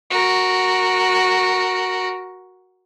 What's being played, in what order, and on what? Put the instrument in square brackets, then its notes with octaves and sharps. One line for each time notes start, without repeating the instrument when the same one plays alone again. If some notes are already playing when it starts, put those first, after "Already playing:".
[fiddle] F#4 A#4